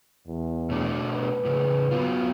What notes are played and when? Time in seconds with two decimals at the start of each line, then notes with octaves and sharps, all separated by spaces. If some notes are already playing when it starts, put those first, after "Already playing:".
0.27 E2
0.70 B2 A3 D4
1.12 B4
1.45 A2 C#3
1.91 F#3 B3 F4